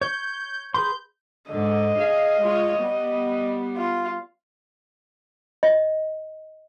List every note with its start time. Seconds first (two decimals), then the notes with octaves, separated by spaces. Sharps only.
0.01 C#5 G6
0.74 G#4 B4 C6 G6
1.51 G#2 D3 D#5
1.98 G#4 F5
2.42 G#3 F4 C#5
2.79 G3 B3
3.77 F4
5.63 D#5